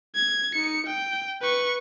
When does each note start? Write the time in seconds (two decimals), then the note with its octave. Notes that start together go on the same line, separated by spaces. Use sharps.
0.15 G#6
0.55 D#4 C#7
0.87 G5
1.42 B4 C#6